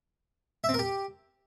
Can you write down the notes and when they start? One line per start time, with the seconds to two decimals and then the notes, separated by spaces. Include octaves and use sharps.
0.64 E5
0.69 C4
0.74 A#4
0.79 G4